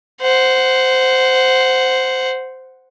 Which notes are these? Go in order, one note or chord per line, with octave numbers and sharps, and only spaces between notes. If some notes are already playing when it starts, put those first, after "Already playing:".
C5 F#5